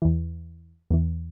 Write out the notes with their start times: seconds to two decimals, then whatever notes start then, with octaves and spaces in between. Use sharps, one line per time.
0.02 E2 E3
0.90 E2 E3